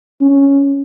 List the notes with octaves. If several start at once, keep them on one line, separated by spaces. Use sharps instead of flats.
C#4